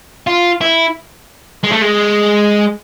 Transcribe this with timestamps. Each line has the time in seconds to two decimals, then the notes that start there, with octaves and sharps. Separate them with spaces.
0.27 F4
0.61 E4
1.64 G#3
1.72 A3
1.82 G#3